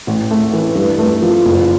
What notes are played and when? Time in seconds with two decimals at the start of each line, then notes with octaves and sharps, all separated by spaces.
0.07 A1
0.31 A3
0.53 E3
0.75 G2
0.98 A3
1.22 F3
1.45 F#1